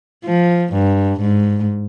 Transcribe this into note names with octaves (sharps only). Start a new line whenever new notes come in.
F3
G2
G#2